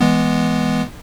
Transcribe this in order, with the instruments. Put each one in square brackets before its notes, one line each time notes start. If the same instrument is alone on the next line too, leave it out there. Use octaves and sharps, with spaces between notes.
[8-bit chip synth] E3 G#3 B3